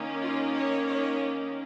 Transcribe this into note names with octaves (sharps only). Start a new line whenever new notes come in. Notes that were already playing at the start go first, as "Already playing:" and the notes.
Already playing: D#3 A#3 C#4
F4
C#5
C#5